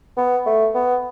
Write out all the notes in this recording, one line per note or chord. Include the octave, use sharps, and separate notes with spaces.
B3
A3
B3